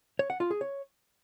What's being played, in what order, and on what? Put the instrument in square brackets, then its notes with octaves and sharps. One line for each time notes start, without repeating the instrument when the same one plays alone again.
[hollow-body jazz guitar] C#5
F#5
F4
G#4
C#5